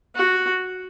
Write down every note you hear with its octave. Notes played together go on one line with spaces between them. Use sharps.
F#4